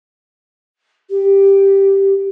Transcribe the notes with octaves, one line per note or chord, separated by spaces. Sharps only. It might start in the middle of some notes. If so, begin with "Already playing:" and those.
G4